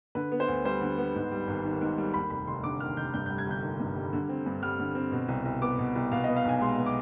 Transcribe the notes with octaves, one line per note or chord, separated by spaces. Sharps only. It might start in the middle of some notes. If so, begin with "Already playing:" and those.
D3 B4
B3
C5
D2
G3 C5
D3
B3
G#2
G3
G#1
D#3
G#2
G3
D#2 B5
F1 B5
F1 C6
D3 D6
D#2 F6
F1 G6
G2 G6
G3 G6
G#6
G1 G6
D#3
G2
G3
D3
C4
G2
G3 F6
D3
C4
B2
C2
C2
B3 D6
B2
C2
B2 F5
B3 D#5
F5
B1 G#5
G#3 C6
B2
D6